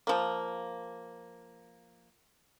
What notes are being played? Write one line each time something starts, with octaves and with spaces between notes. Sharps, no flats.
F3 A#3